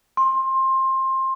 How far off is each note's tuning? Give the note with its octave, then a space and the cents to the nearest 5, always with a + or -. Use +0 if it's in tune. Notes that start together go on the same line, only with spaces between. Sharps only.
C6 +20